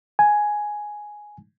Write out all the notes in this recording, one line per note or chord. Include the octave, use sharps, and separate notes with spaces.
G#5